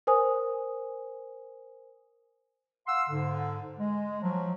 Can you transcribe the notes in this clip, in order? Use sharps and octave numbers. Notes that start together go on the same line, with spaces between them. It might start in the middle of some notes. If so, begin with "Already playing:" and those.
A#4 C5 G#5 D#6
F5 F#5 C6 E6
G#2 D3
G#3
F3 F#3